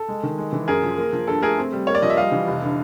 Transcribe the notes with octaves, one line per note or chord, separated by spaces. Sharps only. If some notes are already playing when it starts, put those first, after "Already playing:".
Already playing: A4
G#3
D#3
G#3
E3
F#2 G#4 A#4
F3
A#3
F3
G2 A4
A3 G#4 A#4
C4
G3
A#3 C#5
D5
F3 D#5
E5
G3 D#5 F5
E3
F1
D3